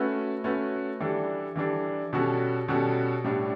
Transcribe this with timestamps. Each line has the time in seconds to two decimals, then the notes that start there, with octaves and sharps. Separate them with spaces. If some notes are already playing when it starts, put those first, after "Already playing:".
Already playing: A3 C#4 F#4 B4
0.44 A3 C#4 F#4 B4
1.00 E3 G3 D4 A4
1.56 E3 G3 D4 A4
2.13 B2 G3 C#4 F#4 A4
2.68 B2 G3 C#4 F#4 A4
3.25 A2 G3 D4